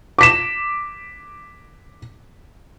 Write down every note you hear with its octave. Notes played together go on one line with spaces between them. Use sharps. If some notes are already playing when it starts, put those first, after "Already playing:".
D6 B6 E7